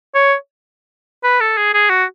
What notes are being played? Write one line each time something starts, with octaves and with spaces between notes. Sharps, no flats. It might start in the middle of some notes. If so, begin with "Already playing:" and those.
C#5
B4
A4
G#4
G#4
F#4